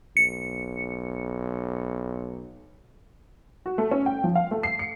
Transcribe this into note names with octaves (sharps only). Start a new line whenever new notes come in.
B1 C#7
F#4
A3
C#4
G5
F3
F5
A3
C7
C#7